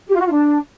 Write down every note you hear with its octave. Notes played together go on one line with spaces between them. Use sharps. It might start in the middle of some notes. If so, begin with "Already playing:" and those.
G4
F4
F#4
F4
D4